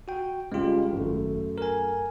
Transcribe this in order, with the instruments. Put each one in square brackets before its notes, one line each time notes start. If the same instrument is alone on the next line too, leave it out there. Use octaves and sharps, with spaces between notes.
[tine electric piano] F#4 G5
[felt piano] C#2 G3 [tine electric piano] G#3 F4
[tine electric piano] G#1 [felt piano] F#2 A3
[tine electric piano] A#4 G#5